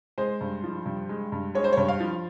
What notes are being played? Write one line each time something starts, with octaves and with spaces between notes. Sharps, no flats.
G#3 C5
G2
F3
G2
G#3
G2
G#3 C#5
C5
G2 C#5
F5
F3